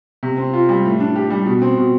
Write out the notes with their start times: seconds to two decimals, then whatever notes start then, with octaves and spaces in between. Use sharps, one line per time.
0.23 C3
0.38 C4
0.53 F4
0.69 G3
0.85 A2
1.00 D4
1.16 G4
1.30 G3
1.46 B2
1.62 C4
1.77 B2